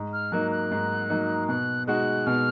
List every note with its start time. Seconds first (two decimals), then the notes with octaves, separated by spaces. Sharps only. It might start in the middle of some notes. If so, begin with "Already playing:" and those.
Already playing: G#2
0.13 F6
0.32 F#3 A#3 D#4 F#6
0.51 F#6
0.71 G#2
1.10 F#3 A#3 D#4
1.48 B2 F#6
1.87 G#3 D#4 F#4 F#6
2.27 B2 F6